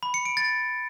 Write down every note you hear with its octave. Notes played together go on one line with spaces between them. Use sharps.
B5
C#7
D7
A6